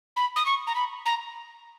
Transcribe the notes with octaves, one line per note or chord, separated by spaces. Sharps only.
B5
D#6
C#6
A#5
B5
A#5